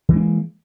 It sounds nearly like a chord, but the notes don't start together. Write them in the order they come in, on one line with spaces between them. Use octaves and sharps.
E3 G#3 D4 A#3